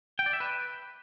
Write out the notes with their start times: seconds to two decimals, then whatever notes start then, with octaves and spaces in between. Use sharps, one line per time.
0.19 G5
0.26 D5
0.33 E5
0.40 B4